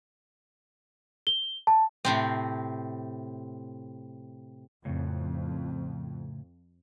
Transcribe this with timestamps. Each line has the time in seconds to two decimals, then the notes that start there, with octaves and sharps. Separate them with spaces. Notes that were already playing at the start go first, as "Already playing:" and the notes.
1.27 G7
1.67 A5
2.05 A2 C3 C4
4.85 F2 A2 C#3